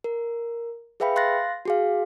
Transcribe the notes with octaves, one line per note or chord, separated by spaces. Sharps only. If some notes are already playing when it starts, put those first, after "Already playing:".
A#4
G#4 B4 E5 F5 G5 B5
F5 C6 F#6 A6 A#6
F#4 G#4 F5